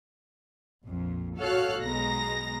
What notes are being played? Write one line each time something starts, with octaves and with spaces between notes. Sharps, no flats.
A#1 F2
F#4 A4 C#5 F5 F6 F#6
B1 B2 G#3 A#5 A#6